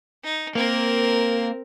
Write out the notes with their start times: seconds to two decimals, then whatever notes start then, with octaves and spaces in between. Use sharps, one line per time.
0.24 D#4
0.55 A#3 C4 A#4